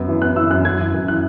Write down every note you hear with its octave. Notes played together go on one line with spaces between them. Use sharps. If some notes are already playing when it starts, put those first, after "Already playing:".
Already playing: F#2 B3
E3
B3 F#6
E3 E6
F#2 F#6
F#2 G#6
E3
F#2
E3 F#6